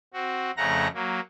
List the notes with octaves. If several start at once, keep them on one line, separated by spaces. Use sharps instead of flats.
C4 F#4
F2 C#3 A3 F#5 A#5 A#6
F#3 A#3